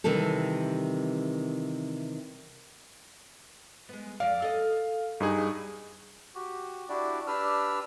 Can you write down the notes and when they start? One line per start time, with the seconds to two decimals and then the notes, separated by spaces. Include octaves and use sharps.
0.04 C3 D#3 E3 G3 A4
3.89 G#3 B3
4.20 F2 D5 F5
4.42 A4 D#5
5.20 G2 D#4 G#4
6.35 F#4 G4
6.89 D4 E4 F#4 G4 D5
7.27 D4 G4 B4 E6 F6